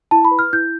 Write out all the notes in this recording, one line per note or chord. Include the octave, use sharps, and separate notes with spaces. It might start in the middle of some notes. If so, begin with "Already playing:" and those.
E4 A5
B5
B4
F6
E4 G6